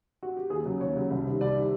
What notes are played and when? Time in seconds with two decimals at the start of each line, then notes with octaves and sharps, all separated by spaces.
0.23 F#4
0.37 G4
0.50 D#2 G#4
0.65 C#3 F#3
0.80 D#2 C#5
0.96 C#3 F#3
1.10 C2
1.26 C3 D#3
1.41 C2 D5
1.56 C3 D#3